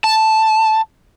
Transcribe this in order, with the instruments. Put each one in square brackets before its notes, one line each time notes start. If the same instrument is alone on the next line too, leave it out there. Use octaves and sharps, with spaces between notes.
[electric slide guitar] A5